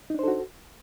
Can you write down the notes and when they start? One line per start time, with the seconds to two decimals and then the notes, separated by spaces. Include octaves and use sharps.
0.10 D#4
0.14 D4
0.19 C5
0.23 A4
0.28 F#4